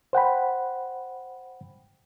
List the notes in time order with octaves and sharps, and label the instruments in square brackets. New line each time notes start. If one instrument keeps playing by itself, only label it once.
[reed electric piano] C5 F#5 G5 B5